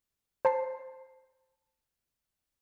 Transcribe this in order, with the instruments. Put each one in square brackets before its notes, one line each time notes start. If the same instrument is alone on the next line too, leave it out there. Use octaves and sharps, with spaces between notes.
[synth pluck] C5 A5 C7